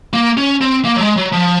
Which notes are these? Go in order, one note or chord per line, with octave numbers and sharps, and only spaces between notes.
A#3
C#4
C4
A#3
F#3
G#3
F#3
F3